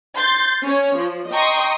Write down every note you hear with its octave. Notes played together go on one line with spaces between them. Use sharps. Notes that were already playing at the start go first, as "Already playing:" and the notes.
C6 G6 A6
C#4 C#5
F3
D#5 G5 A#5 C6 C#6 D#6